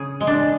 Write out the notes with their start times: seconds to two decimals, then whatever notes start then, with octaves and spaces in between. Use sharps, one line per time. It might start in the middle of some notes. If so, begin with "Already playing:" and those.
Already playing: C#3 G#4
0.20 G#3
0.27 D4